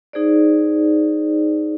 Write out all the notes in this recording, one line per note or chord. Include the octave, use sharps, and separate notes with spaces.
D#4 G#4 C5 D5